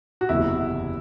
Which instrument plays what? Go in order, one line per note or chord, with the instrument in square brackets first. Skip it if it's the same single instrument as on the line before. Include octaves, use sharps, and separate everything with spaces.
[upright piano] F#4
[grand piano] F#1 E2 C3 [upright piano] E4